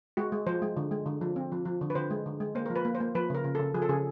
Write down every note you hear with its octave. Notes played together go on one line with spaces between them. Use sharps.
G#3 F#4
G#3
F3 C5
G#3
D3
G#3
D3
F3
C4
F3
F3
D3
B4
D3 C5
G#3
D3
G#3
A#3 C5
F3 A#4
B4
A#3
C5
A#3
F3 B4
C#3 A#4
C#3
C#3 A4
F3 G#4
A4
C#3 G#4